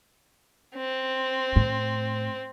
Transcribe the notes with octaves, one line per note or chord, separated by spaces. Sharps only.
C4
A2